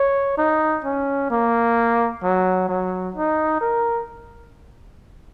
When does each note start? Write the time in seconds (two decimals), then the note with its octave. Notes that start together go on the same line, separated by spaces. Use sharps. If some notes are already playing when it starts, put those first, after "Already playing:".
Already playing: C#5
0.38 D#4
0.84 C#4
1.30 A#3
2.23 F#3
2.69 F#3
3.16 D#4
3.61 A#4